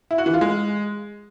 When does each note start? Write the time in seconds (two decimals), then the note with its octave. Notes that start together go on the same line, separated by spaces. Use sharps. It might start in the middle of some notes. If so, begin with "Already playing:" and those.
0.11 E4
0.18 F#4
0.26 E3
0.34 F4
0.41 G#3